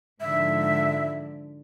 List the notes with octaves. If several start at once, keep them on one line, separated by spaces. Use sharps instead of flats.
G#2 D3 F3 E5